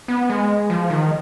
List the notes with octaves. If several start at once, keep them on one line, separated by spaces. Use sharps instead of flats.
B3
G#3
F3
D#3